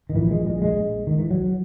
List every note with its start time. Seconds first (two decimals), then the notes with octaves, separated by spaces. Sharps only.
0.09 D#3
0.15 A#1 A#2 E3
0.31 G#3
0.46 G#3
0.62 G#3
1.07 D#3
1.19 E3
1.31 F#3